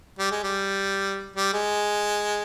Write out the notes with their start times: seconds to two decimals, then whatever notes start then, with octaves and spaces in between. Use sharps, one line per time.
0.19 G3
0.31 G#3
0.43 G3
1.36 G3
1.53 G#3